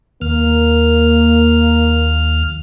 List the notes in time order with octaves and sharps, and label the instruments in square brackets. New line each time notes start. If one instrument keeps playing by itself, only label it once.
[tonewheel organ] D#2 F6 [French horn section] A#3